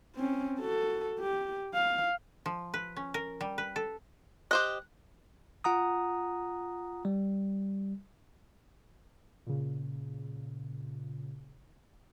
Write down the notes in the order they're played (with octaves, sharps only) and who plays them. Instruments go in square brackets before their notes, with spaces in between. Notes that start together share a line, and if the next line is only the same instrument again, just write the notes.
[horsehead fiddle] C4 C#4
F#4 A4
G4
F5
[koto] F3
B4
C#4
A#4
G3
B4
A4
[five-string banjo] G4 C5 D#5 [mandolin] F#6
[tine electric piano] F4 F#5 A#5 D#6
G3
[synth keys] A#2 C#3